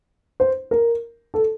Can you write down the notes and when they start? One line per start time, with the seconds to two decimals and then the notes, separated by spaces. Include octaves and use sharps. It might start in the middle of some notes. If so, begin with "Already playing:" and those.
0.40 C5
0.71 A#4
1.34 A4